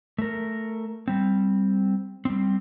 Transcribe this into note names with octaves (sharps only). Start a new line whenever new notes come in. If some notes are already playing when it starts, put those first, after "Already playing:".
A3 A#4
G3 C4
G3 C4